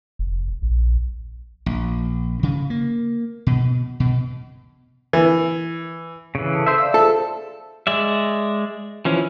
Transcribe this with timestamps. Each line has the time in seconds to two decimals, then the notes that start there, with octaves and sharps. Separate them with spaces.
0.19 F1
0.62 A#1
1.66 A#1
2.43 C#3
2.70 A#3
3.47 B2
4.00 B2
5.13 E3
6.35 C#3 E3
6.53 A4 A5 D#6
6.66 C5 E5 C6
6.78 D5 E5 F5 E6
6.94 F4 G#4 A4 C5
7.87 G#3 D5 E5
9.05 E3 F3 C#4